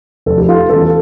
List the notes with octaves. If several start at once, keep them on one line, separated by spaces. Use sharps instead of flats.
F1 A4
G4
F4 A4
E2 C#3 G3 F4 A4